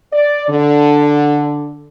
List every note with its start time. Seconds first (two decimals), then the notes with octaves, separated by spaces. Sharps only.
0.12 D5
0.49 D3